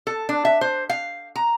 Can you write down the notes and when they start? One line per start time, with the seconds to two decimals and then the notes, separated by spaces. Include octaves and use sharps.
0.07 A4
0.29 D4
0.45 E5
0.61 C5
0.89 F5
1.36 A#5